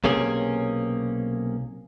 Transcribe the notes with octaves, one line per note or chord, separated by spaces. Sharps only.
B1 C3 A#3 C#4 G#4